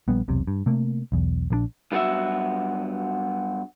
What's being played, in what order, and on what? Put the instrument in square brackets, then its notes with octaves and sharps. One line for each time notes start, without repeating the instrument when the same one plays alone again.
[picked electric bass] A#1 G3 B3
E1 B1 C3
G2
C3 A3 A#3
B1 E2
A#1 D3 D4
[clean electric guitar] G2 F#3 B3 C#4 F#4 E5